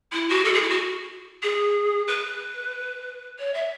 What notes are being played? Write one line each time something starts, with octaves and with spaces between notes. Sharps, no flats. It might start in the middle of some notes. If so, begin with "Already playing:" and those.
E4
F#4
A4
G#4
E4
F#4
G#4
B4
C#5
E5